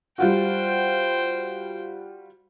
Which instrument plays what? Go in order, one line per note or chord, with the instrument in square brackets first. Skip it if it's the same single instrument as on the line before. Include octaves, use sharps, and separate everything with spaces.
[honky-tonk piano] G3 F4 F#4 [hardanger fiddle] C5 G5